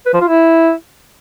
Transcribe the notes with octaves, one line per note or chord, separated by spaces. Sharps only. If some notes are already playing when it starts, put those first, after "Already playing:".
B4
F3
F4
E4